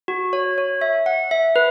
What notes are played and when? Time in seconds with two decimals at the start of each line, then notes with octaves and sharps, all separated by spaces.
0.08 F#4
0.33 C#5
0.58 C#5
0.81 E5
1.06 F#5
1.31 E5
1.56 B4